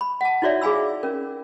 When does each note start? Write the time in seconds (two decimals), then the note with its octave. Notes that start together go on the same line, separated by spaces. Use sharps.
0.01 B5
0.21 F#5 A5
0.42 D#4 E4 F#4 C#5 D5 E5
0.61 G#4 F5 G#5 B5 E6
1.03 C#4 A#4